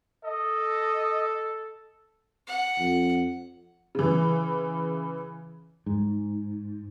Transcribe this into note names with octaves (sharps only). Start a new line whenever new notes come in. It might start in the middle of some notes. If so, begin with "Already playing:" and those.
A4 D#5
F#5
F2
C#3 E3
G#2